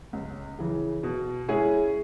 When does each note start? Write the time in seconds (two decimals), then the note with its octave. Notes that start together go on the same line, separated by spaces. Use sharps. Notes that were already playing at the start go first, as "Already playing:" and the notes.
0.13 C#2
0.59 C#3 E3
1.03 B2
1.48 G#3 C#4 E4 G#4